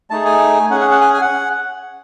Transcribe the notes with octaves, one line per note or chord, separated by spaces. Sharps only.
A3 D#4 G#4 A5
G#5
C#4 G#4 F#5
F#5
F#5
G#5
G#5
F#5